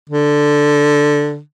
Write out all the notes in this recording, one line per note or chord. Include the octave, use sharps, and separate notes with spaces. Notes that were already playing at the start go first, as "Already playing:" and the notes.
D3